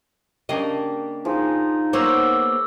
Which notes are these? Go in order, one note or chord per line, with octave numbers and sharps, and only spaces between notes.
C#3 A#3 D4 G4 D#5
F3 D#4 G#4
A#3 B3 C5 C#5 F#5 A#5 D6 E6